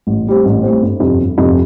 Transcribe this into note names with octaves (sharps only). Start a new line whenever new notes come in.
A1
A2 G3 C4
A1
A2 G3 C4
G1
F2 C3
G1
F2 C3